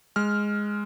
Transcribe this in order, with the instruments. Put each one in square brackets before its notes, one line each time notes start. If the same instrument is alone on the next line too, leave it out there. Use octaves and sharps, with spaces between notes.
[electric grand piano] G#3 F6